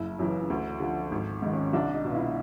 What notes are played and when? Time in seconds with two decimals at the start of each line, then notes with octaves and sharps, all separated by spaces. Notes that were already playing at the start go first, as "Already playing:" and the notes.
Already playing: F#1 E4
0.19 F#2 C#3 E3
0.50 D2
0.80 D3 F3
1.11 G#1
1.42 G#2 D#3
1.53 C#4
1.73 C2 D4
1.94 D#4
2.04 B2
2.10 F4
2.15 E4